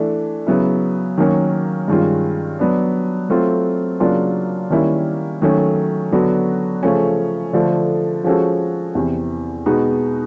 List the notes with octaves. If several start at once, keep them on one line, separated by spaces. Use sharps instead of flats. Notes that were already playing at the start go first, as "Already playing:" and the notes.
Already playing: E3 A3 D4
C#3 F#3 B3 E4
D#3 F#3 A#3 C#4
G2 D#3 G#3 C#4 F4
F#3 B3 D4
F#3 A3 C4 F4
C#3 F#3 A#3 D4 F4
D#3 G3 A#3 C#4 E4
D#3 F#3 A3 C#4
D3 F#3 B3 D4 F#4
C#3 F3 A3 C#4
D3 F3 A3
F3 G#3 C#4 F#4 A4
E2 C3 E3
B2 G#3 B3 D#4 F#4